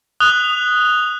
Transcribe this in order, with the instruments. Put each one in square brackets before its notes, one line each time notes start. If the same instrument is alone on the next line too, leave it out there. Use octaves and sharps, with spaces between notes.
[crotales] D#6 F#6 F7 G7